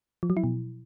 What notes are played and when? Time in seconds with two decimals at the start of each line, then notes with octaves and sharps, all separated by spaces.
0.23 F3
0.30 F#3
0.37 E4
0.44 B2